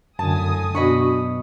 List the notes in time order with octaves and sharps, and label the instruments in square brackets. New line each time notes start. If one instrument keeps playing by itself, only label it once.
[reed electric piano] F#2 D3 [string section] A2 G#5 D#6 [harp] A5
[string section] F#2 B2 [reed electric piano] D4 F#4 [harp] D#5 B5 C#6